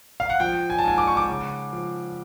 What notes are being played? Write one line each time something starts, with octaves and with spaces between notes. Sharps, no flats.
F5
F#5
F3 G5
G#5
A5
G#2 G#5
D6
C#6
D6
C#3
F3